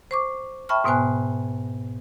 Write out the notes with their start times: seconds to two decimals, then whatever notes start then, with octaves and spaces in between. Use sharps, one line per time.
0.11 C5 C#6 D6
0.69 E5 G5 A5 B5 C#6 F6
0.84 G#2 B2 B3 C5 G#5 F#6